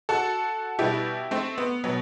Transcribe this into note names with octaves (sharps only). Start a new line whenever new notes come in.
F#4 A4
B2 G3 E4 G4
A3 C4
B3
B2 F#3 B3